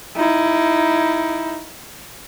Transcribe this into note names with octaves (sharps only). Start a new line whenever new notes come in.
D#4 E4